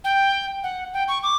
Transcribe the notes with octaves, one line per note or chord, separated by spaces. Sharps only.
G5
F#5
G5
C#6
D6